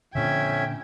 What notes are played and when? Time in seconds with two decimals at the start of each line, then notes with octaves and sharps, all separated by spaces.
0.15 F2 A#2 D3 C#4 E5 G5 G#6